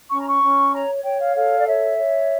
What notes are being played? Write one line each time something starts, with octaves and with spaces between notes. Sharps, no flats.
C#4 C#6
A#5
C#6
C#4
C#5 A#5
C#5 G5
F5
A4 F5
D5
C#5 E5
C#5